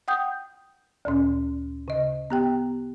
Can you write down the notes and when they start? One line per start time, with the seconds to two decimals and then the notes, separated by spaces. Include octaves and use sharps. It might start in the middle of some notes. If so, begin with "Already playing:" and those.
0.08 F#5 G5 D#6 G6
1.05 D2 A#2 C#4
1.88 C#3 D#5
2.30 B3 G4 G5